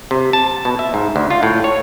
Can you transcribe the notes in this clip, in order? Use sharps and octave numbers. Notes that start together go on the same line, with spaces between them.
C3
A5
B2
E5
G#2
D2
F4
A2
C#5